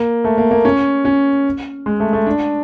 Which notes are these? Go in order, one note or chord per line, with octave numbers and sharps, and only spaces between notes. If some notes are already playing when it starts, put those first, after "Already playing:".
Already playing: A#3
A3
A#3
A#3
C#4
C#4
G#3
A3
A3
D4